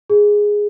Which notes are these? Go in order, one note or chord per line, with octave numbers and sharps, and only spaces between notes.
G#4